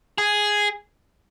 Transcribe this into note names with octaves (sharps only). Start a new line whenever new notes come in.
G#4